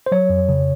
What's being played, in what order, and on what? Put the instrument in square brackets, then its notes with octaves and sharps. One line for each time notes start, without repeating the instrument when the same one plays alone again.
[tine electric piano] C5
F#3 C#5
F2
C#3